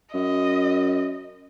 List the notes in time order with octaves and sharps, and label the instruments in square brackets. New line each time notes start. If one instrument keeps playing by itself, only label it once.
[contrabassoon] F#2 [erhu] D#5